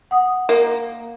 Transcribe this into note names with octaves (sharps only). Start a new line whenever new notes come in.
F#5 D#6
A#3